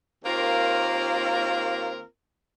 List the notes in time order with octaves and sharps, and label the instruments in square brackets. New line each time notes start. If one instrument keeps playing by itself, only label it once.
[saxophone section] D#2 A#3 C4 F4 A#4